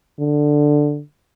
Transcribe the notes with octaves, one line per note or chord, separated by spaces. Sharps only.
D3